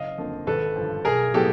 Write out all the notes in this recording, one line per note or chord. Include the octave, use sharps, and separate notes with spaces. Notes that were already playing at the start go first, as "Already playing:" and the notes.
Already playing: F#1 D#5 F5
F2 D3 F3 A#3
G#1 A4 B4
G2 D3 F3
B1 G#4 A#4
A2 F#3 B3 G4 A4